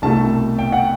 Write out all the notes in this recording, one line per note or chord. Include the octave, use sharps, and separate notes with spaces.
C2 B2 A3 A5
G5
F#5